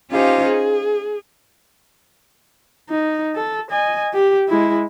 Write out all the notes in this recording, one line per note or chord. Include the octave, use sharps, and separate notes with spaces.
C#4 D#4 F4 G4 C5 F5
G#4
D#4
A4
D#5 G#5
G4
G#3 E4